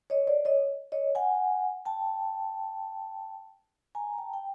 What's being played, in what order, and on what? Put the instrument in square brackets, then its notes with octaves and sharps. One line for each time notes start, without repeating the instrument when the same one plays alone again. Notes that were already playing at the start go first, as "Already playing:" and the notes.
[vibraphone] C#5 D#5
C5 D5
C#5 D#5
C#5 D#5
F#5 G#5
G5 A5
G#5 A#5
A#5
G5 A5
G5